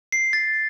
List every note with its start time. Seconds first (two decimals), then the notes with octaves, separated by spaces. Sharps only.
0.12 C7
0.33 A6